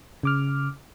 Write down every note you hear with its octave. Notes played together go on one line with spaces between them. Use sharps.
C#3 D6 F6